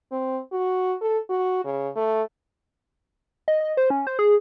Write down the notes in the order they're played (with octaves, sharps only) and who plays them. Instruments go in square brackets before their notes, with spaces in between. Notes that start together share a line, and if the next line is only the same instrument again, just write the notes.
[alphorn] C4
F#4
A4
F#4
C#3
A3
[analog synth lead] D#5
D#5
C5
C#4
C5
G#4